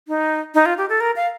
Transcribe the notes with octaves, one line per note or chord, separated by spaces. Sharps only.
D#4
D#4
F4
G4
A4
A#4
F5